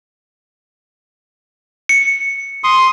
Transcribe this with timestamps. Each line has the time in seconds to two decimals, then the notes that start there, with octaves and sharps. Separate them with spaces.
1.89 C#7
2.64 C6 D#6